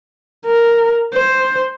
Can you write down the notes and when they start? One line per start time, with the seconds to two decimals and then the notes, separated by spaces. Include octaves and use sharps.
0.46 A#4
1.14 C5